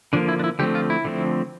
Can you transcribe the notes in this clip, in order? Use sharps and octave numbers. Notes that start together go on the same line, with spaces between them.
D3 F3 A#3 D4
E4
D4
E4
D3 F3 A3 C4 G4
F4
E4
D3 F3 A3 C4